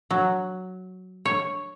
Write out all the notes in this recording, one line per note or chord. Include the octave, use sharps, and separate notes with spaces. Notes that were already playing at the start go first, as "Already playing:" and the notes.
F#3
C#5